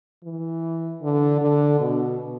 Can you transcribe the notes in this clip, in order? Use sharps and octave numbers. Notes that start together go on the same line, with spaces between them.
E3
D3
D3
B2